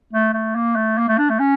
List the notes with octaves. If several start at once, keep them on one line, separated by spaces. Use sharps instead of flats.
A3
A3
A#3
A3
A#3
A3
D4
A3
C#4